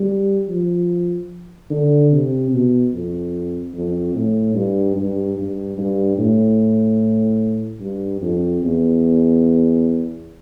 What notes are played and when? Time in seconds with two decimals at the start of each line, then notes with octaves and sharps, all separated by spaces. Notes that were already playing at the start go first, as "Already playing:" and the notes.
Already playing: G3
0.48 F3
1.70 D3
2.12 C3
2.52 B2
2.93 F2
3.74 F2
4.15 A2
4.55 G2
4.96 G2
5.37 G2
5.78 G2
6.18 A2
7.81 G2
8.21 F2
8.63 E2